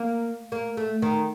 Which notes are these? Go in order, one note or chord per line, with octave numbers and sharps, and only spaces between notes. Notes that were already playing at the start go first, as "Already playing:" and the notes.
Already playing: A#3
A#3
A3
D#3